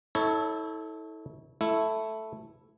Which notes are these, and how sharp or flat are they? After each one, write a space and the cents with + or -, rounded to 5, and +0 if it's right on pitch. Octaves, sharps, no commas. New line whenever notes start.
E4 -40 A4 +0 C#5 +0
A3 +0 E4 +0